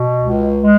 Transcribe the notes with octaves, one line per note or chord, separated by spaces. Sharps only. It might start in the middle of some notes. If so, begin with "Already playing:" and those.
Already playing: B2
C#2
G#3